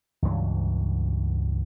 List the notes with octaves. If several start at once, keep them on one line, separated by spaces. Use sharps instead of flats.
C#2 G2 E3 F#3